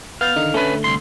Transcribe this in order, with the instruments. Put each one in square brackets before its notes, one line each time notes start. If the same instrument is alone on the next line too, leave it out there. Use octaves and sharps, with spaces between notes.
[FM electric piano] B3 G6 A6 [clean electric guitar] F5
[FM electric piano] D3 D#3 D#4
[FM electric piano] D3 A3 [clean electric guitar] C#4 B4
[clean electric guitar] C2 C6